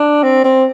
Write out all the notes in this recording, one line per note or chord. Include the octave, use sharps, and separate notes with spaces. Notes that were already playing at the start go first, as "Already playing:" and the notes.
Already playing: D4
C4
C4